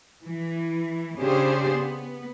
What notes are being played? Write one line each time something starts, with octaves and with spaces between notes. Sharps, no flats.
E3
C#3 C#4 D4 G4 G#4 C5
B3